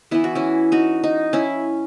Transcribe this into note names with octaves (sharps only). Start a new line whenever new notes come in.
E3 B3 E4
F#4
C#4 E4
D#4 F#4
D#4
C#4 E4